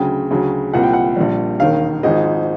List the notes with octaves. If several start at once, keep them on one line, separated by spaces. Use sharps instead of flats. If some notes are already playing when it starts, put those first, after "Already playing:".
Already playing: D2 C#3 F#3 G5
D2 C#3 F#3
C2 A#2 F3 F#5
G5
F#5
A#1 A#2 G3
E1 D#2 D#3 F5
G#1 G#2 F3 G#3 D#5